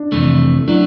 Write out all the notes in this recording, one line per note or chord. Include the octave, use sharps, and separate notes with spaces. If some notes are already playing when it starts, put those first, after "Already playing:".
Already playing: D4
F2 C3 E3 A3
F#3 A3 D4 E4